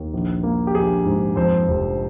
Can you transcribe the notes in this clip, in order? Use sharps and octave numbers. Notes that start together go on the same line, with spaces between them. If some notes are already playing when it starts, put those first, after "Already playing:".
Already playing: D#2
A#1
A#3
G4
A#1 G#4
G#2
F2 C5
F1